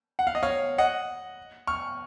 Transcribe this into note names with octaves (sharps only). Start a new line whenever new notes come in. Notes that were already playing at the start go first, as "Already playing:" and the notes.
F#5
F5
D#5
C#5 F5
D#5 F#5
C#6 F6